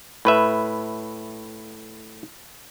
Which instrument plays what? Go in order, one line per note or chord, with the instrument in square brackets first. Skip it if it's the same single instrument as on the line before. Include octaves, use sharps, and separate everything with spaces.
[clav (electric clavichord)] A2 B4 E5